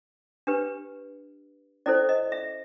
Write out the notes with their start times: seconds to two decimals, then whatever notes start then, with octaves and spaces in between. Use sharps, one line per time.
0.47 D4 G4 B4
1.86 C#4 E4 A4 C5 D5
2.09 D#5
2.32 E5